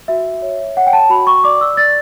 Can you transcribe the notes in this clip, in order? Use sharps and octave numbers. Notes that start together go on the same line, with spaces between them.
F#4 E5
C#5
C#5 F#5
G5
A5
F#4 B5
C#6
D5 D6
E6
D5 A6